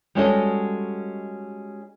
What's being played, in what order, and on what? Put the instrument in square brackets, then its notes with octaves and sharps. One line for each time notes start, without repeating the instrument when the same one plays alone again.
[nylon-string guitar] G3 G#3 C#4 F#4 A4 D#5